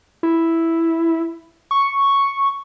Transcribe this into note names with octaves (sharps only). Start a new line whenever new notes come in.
E4
C#6